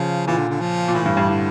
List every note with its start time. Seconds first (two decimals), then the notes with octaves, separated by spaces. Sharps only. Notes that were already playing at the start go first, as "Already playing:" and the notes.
Already playing: C#3 F3
0.27 A#2 E3
0.38 D3
0.49 D3
0.60 F3
0.88 A#2
0.94 A2 E3
1.06 G2
1.17 G2
1.29 D3